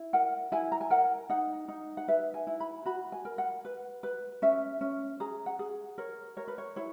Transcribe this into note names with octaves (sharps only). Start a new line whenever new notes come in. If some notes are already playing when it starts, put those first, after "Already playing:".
Already playing: E4
A#4 F#5
E4 G#5
A#5
G#5
A#4 F#5
D#4 F#5
D#4
F#5
B4 E5
G#5
E4
B5
F#4 B5
G#5
A#4
F#5
B4
B4
C#4 E5
C#4
G#4 A#5
F#5
G#4
A#4 C#5
A#4 C#5
B4
C#5
E4 C#5